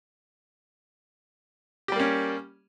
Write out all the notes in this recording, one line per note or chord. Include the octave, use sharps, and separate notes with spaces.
G3 A#3 C#4 G4